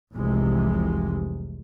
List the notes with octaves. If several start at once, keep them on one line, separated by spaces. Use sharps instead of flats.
F1 C2 C3 E3 G#3